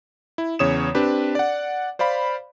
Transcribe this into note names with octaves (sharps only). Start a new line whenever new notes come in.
E4
E2 C#3 C#5 D#6 E7
C4 D4 G4 B4
D5 F#5
C5 D5 F5 B5